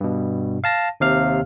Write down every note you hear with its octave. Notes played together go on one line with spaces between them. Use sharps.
G2 B2
F5 A5 A#6
D#2 C3 F5 F6